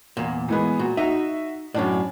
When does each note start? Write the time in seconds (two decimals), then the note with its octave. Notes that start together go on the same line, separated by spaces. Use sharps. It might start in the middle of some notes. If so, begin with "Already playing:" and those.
0.17 E2 A#2
0.49 E3 G#3 B3
0.79 A#2 F#4
0.97 D#4 F#4 E5
1.74 F#2 A2 C#4 D4 D5